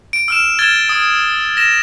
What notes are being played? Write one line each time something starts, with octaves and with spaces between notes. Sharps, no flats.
D7
E6 F6 E7
F6 G#6 A6 E7 G7
D#6
A#6 E7